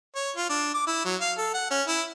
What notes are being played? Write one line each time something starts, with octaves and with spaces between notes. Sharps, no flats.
C#5
F4
D4
D6
E4
F#3
F5
A4
F#5
C#4
E4